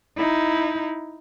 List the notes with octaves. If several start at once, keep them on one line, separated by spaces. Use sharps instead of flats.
D#4 E4